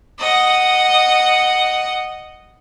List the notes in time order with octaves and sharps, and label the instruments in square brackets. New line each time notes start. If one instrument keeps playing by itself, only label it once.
[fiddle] D#5 F#5